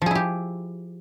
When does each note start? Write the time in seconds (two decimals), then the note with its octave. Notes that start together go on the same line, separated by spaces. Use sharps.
0.02 F3
0.06 G#4
0.11 E4
0.15 G4